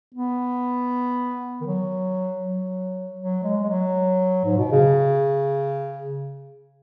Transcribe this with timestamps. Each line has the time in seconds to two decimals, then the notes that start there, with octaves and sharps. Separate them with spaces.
0.14 B3
1.61 D#3
1.66 F#3
2.42 F#3
3.19 F#3
3.44 G#3
3.63 G#3
3.69 F#3
4.45 G#2
4.58 B2
4.72 C#3